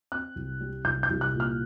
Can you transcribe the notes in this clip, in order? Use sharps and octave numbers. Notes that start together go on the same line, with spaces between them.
C4 F#6
C2
G3
C2 G6
G6
C2
F#6
A#2
F6